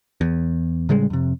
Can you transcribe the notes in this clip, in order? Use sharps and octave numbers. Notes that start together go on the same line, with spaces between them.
E2
A2 C#3 G3 G#3
F2 C3